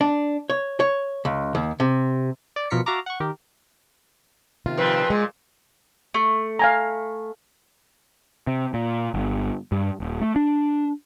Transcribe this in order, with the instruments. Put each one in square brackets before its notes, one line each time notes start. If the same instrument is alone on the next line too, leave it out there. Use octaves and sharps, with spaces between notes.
[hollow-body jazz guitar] D4
C#5
C#5
C#2
D#2
C3
[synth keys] D5
B2 F3 F4 A#4 B6 C#7
F#4 E5 F5 A5 A#5 D6
F#5 C#6
D#3 G4 A#4
[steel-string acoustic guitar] C3 D#3 F4
[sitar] A#2 F3 C4 [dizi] B4
[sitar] A#2 [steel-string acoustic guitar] G#3
[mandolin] A3
[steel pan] F5 G#5 A#5
[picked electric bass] C3
A#2
G1
G2
D#1
A3
D4